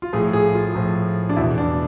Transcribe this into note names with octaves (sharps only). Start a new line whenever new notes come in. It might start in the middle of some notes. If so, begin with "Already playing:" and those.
F4
A2 F3 G#4
G#4
F4
A2 F3
D4
E2 B2 E4
D4